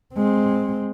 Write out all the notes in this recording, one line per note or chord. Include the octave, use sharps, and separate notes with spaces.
G#3 C4